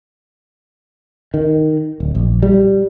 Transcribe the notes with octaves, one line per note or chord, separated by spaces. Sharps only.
D#3
D1
A#1
G3